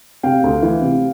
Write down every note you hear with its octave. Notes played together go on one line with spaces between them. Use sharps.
C3 F5 G5
D2
E3
C3